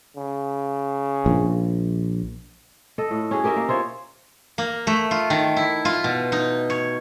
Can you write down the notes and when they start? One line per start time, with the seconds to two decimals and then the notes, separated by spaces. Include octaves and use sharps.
0.17 C#3
1.26 A#1
2.98 A4 D#5
3.11 A2
3.31 C#4 F#4 G#4
3.44 G4 A#4 D#5 E5
3.56 A#3
3.68 E4 F4 C5 C#5
4.58 A#3
4.87 A3
5.11 F4
5.30 D#3
5.56 E4
5.85 F4
6.04 B2
6.32 D#4
6.70 C#5